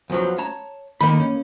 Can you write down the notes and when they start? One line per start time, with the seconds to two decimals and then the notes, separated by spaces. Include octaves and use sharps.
0.10 E2 F3 F#3
0.38 C#5 A5 A#5
1.01 D3 D#3 A#3 B5
1.19 C#4